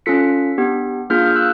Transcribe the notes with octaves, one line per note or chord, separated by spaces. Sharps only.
C#4 F4 A4 B6 C#7
B3 D4 G4
A#3 D4 F4 G#4 F6 G6
F6
E6 F#6